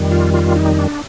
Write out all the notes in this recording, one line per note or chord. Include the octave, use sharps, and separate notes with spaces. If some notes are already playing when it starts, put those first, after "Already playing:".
Already playing: F2 D#3 G3
F4
F4
D#4
D4